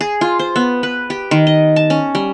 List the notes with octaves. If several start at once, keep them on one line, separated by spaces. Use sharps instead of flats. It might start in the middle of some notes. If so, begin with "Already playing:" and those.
G#4
F4
C5
B3
B4
G4
D#3
D#5
A5
C#4
G3